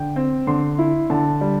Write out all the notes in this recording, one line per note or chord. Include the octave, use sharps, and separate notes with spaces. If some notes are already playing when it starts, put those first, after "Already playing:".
Already playing: D3 G5
C4
D3 C6
E4
D3 A5
G3